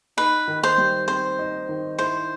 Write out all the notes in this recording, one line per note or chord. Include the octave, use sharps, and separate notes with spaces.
D#4 B4
D#3
C5
G3
C4 C5
D#4
D#3
E4 C5